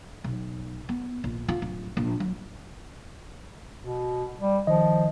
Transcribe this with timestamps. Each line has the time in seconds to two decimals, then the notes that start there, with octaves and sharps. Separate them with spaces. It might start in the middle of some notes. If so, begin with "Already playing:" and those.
0.24 B1
0.89 B3
1.24 A#1
1.48 F4
1.62 D1
1.97 A#1
2.20 F#3
3.81 B2
4.40 G3
4.67 D#3 F3 D#5